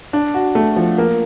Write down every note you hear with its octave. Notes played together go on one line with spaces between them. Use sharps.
D4
F#4
A3
F3
A#3